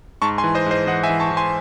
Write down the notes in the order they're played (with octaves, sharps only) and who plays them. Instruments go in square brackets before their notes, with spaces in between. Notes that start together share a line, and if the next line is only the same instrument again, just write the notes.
[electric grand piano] G#2 A5 C#6
G#5 C6
E3
C5 D#5
G#2 C5 D#5
E3 D#5 F#5
E5 G#5
E3
A5 C#6
E3
G#5 C6